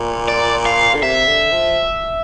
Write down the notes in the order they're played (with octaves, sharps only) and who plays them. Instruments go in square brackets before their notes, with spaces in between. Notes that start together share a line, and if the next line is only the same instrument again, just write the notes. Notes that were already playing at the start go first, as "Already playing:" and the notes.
Already playing: [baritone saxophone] A#2
[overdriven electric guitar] D5
F5
[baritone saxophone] D3
[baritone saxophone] C3 [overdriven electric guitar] E5
[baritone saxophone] D3
F3